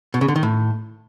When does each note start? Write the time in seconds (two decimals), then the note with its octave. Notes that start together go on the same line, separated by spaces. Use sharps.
0.14 B2
0.21 C#3
0.28 D3
0.36 D#3
0.43 A2